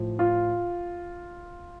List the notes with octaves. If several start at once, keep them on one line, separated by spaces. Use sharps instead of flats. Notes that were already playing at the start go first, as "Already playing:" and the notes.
Already playing: A2 F3
F4